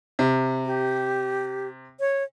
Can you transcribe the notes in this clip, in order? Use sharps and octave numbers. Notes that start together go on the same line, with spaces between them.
C3
G4
C#5